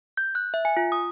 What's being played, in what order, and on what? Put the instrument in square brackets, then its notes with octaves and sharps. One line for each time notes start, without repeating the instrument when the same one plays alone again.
[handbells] G6
F#6
E5
G#5
F4
D#6